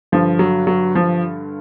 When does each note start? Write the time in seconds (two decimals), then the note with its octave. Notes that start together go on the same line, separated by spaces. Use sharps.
0.12 G2 D3 F3
0.39 F#3
0.67 F#3
0.95 F3